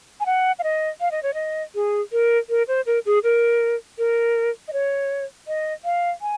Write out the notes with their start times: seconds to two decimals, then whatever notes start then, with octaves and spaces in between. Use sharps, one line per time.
0.20 G#5
0.26 F#5
0.59 F5
0.63 D#5
1.01 F5
1.11 D#5
1.23 C#5
1.34 D#5
1.75 G#4
2.12 A#4
2.50 A#4
2.68 C5
2.86 A#4
3.06 G#4
3.23 A#4
3.98 A#4
4.68 D#5
4.73 C#5
5.48 D#5
5.84 F5
6.22 G#5